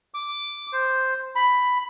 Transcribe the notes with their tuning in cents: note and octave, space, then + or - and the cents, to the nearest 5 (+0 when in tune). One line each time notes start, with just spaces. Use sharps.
D6 -5
C5 +0
B5 +5